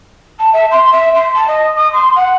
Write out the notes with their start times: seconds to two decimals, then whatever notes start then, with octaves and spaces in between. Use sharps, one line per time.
0.39 A5
0.53 E5
0.71 C6
0.92 E5
1.14 C6
1.34 A5
1.47 D#5
1.76 D#6
1.92 C6
2.15 F#5